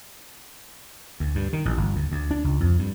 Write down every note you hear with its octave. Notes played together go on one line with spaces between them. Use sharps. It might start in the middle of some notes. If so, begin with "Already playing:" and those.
D2
G2
D#3
A1
G1
D2
D2
D4
C#2
F2
G2